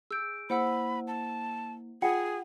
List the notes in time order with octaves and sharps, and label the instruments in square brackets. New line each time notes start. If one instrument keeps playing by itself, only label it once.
[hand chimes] G#4 D7 [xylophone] E6 G6
[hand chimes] A#3 E4 [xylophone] C5 F#5 E6 [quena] B5
[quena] A5
[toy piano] F4 F#5 G5 [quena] G#4 [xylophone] C#7